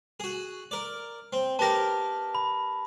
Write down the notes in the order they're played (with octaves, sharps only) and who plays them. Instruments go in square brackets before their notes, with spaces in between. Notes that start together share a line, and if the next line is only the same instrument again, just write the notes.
[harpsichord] F#4 G#4
A#4 D5
C4
[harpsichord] B3 G4 A#4 [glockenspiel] A5 A#6
[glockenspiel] B5